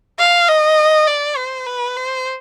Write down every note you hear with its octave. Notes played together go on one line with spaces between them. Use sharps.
F5
D#5
D5
C5
B4
C5